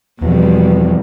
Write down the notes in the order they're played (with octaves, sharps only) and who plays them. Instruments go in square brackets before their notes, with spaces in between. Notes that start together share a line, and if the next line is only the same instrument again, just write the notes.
[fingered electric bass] E2 F3 [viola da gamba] B2 G3